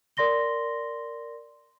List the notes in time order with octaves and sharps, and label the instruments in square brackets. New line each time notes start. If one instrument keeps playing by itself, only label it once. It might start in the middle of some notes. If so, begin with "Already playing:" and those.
[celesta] A#4 D5 C6 A#6 G7